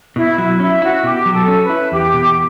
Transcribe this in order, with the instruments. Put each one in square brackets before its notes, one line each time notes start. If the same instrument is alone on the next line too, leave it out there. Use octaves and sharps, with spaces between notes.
[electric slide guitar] B2 [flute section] E4
[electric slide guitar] F#3 [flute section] E4
[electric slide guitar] C#4 [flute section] E4
[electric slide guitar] E4 [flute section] F#4
[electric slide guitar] B2 [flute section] G4
[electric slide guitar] F#3
[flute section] A4
[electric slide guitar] C#4
[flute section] B4
[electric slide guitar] E4
[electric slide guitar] E2 [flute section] G4
[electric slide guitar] B2